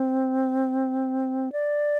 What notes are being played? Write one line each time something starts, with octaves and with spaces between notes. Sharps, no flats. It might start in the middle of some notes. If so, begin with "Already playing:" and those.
Already playing: C4
D5